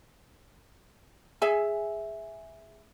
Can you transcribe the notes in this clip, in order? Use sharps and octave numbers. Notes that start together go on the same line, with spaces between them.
G#4 E5 G#5